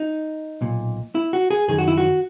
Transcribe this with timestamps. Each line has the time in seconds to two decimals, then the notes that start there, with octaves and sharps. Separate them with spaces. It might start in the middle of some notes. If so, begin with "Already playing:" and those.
Already playing: D#4
0.61 B1 A#2
1.15 E4
1.33 F#4
1.51 G#4
1.68 F#2 D#3 G#4
1.78 F#4
1.88 E4
1.98 F#4